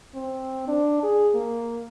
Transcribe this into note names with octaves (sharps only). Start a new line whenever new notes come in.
C4
D4
G#4
A#3